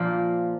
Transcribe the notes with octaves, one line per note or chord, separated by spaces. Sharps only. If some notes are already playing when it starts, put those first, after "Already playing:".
Already playing: A#2 F3 A#3 F4